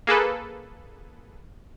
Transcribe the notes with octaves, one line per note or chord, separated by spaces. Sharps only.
A#3 G#4 A4 B4